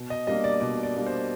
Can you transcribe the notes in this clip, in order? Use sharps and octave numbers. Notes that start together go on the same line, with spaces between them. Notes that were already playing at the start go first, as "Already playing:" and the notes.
Already playing: B2
D#5
G3 A#3 D4 D#5
D5
B2 D5
D5
G3 A#3 D4
C5